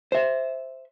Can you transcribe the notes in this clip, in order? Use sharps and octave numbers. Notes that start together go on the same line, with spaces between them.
C5 E5